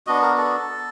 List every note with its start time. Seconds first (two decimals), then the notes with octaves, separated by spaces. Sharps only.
0.07 B3 D4 F#4 D#5
0.22 A#4
0.38 A4